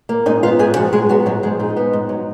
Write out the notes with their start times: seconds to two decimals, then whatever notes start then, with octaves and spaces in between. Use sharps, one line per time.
0.09 A#3
0.26 G#2 D#4 D#5
0.43 B3 F4 F5
0.59 G#2 G#4 G#5
0.76 F3 F#4 F#5
0.93 G#2 G#3 G#4
1.09 F#3 B3 F#4
1.26 G#2 F#3 F#4
1.43 F3 G#3 G#4
1.59 G#2 D#4
1.77 B3
1.93 G#2
2.09 F#3